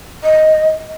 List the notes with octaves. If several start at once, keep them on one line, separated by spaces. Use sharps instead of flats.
D#5